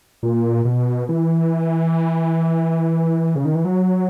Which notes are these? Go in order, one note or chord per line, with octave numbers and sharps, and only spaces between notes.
A#2
B2
E3
C#3
D#3
E3
F#3